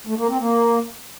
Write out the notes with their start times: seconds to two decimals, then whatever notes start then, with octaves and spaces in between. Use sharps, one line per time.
0.07 A3
0.18 A#3
0.29 C4
0.40 A#3